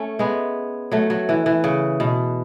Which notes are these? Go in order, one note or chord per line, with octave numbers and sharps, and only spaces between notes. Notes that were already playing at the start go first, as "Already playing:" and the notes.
Already playing: A3 C#4
G#3 B3
F#3 A3
F#3
E3
E3
C#3
B2